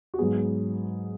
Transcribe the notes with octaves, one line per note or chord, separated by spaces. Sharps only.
F#4
G#2 F#3 B3 G#4